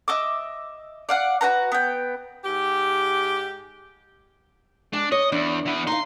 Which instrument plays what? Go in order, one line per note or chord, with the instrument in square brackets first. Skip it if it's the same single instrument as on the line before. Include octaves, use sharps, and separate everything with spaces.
[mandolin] D#5 E5 D6
D5 F5 F#5
F#4 G4 B4 A#5
B3 G5
[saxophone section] G#2 G4
[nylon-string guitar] G#3 [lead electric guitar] D4
[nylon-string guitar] C#5 [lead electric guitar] D#5
[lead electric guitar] E2 [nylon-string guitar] D4
[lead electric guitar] E3 B3
[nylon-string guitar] D#4 F5 [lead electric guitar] C6